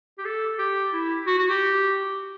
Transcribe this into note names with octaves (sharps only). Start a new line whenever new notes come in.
G4
A4
G4
E4
F#4
F#4
G4